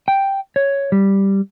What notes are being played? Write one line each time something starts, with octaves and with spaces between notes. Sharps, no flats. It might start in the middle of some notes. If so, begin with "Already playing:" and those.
G5
C#5
G3